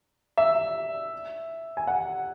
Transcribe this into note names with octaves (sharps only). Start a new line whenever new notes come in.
E5
G#5
F#5